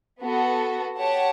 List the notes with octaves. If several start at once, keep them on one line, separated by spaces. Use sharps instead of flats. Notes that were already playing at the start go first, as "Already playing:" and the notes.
B3 F#4 A4
G4 C#5 F#5 A5